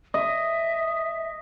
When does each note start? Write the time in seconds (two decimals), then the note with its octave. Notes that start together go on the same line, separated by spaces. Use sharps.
0.14 D#5 E5